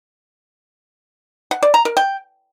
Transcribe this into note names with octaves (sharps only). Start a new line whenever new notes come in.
F#5
D5
A#5
A#4
G5